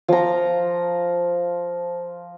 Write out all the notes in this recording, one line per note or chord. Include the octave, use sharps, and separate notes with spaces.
F3 A#5